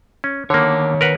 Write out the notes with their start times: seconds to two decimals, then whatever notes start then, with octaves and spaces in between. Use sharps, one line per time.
0.24 C#4
0.50 D3 D#3 A#3 C#5
1.01 A#4 B4 F#5